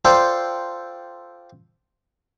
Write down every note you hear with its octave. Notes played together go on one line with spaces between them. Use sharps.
F4 A4 C5 D5 G5